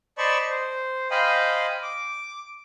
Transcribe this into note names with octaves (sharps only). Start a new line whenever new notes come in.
C5 D5 D#5 A5 B5 C#6
C5
C5 D#5 F5 G5 G#5 B5
D6